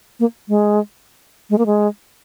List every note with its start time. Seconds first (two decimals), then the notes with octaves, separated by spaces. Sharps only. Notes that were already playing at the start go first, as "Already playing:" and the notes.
0.20 A#3
0.48 G#3
1.50 G#3
1.58 A#3
1.66 G#3